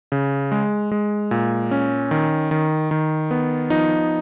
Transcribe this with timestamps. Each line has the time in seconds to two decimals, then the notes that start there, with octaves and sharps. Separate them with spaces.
0.12 C#3
0.52 G#3
0.92 G#3
1.31 A#2
1.71 C#4
2.11 D#3
2.51 D#3
2.91 D#3
3.31 B3
3.70 F3 D#4